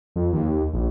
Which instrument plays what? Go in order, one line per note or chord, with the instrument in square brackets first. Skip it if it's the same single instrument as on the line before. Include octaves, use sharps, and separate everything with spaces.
[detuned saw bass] F2
D#2
A#1